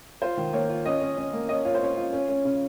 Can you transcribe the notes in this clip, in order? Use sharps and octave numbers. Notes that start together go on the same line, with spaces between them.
F4 C5
D#3
A#3 C#5
F4
C#4 D#5
C#4
C#4
A#3
C#4 D#5
F4 C#5
C5
C#4 C#5
F4
C#4
C#4
C#3